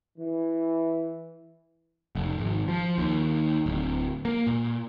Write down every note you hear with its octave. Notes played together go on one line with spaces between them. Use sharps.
E3
F1
G#1
F3
D#2
D1
A#3
A#2